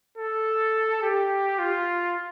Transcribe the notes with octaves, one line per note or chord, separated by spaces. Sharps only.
A4
G4
F4